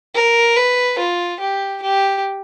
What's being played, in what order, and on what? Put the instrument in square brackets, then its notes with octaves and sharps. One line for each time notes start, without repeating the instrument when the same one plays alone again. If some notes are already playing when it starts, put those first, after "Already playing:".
[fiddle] A#4
B4
F4
G4
G4